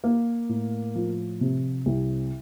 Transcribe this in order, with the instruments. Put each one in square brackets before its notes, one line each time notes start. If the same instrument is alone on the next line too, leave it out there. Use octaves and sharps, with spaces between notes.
[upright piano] A#3
A2
F3
C3
C2